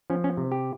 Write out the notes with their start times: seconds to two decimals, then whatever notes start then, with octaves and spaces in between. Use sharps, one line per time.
0.10 F3 C#4
0.24 C#4
0.37 C3
0.52 G4